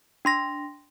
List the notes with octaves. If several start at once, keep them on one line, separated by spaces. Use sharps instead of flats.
D4 C6 A#6